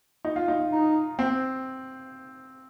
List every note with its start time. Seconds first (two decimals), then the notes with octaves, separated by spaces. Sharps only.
0.25 D#4
0.36 F4
0.48 D#4
0.72 D#4
1.19 C4